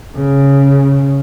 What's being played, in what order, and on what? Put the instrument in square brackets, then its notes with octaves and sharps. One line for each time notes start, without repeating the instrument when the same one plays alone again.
[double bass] C#3